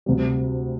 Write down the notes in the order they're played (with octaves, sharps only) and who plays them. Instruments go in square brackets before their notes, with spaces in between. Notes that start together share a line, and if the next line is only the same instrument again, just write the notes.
[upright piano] D2 C3 G3